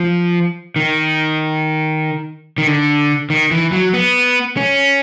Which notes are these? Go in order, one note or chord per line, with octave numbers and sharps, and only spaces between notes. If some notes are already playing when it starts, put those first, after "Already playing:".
Already playing: F3
D#3
D#3
D3
D#3
E3
F#3
B3
C#4